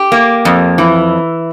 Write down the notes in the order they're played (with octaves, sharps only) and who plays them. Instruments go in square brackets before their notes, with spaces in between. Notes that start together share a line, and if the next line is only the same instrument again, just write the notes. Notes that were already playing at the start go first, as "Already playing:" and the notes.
Already playing: [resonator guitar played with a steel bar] G4
A#3
F2
E3